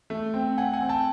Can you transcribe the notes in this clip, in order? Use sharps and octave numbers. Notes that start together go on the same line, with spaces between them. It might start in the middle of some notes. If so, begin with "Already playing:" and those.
A3
C4
C4 F#5 G#5
F#5 G#5
C4
G5 A5